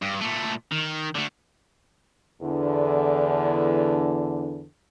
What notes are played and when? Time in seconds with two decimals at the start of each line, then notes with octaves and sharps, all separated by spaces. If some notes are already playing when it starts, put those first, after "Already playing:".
0.02 G2
0.21 A#2 A3
0.72 D#3
1.15 D3 A3
2.42 E2 D3